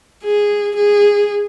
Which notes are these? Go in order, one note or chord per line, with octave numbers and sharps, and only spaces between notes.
G#4
G#4